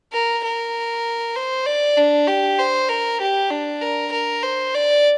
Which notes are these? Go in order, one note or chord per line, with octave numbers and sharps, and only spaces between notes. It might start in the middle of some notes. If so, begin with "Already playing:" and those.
A#4
A#4
C5
D5
D4
G4
C5
A#4
G4
D4
A#4
A#4
C5
D5